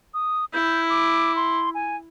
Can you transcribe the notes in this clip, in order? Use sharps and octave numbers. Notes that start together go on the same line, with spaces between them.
D#6
E4 G6
D6
C6
G#5